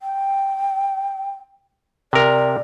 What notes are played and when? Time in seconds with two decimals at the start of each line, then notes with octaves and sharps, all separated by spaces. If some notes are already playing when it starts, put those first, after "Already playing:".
0.01 G5
2.13 C3 A#4 D5